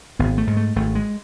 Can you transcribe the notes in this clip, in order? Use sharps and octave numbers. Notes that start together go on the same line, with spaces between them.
G#1 B3
A3
G#2
A3
G#1 A3
G#3